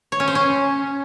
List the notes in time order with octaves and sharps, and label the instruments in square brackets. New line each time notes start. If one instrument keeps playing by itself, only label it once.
[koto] C#5
C#4
C5
C#4